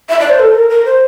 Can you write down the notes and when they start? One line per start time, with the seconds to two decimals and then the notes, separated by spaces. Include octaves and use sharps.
0.09 E5
0.19 D5
0.29 C5
0.39 A4
0.55 A#4
0.70 A#4
0.85 C5